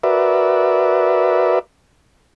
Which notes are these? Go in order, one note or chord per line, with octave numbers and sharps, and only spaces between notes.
F#4 A#4 B4 D5 E5